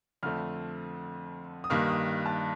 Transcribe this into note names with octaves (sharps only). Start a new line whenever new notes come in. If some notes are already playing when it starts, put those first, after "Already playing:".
F2 D3 A3 C4 F6
D#6
G2 D#3 A#3 F6
D#6
A5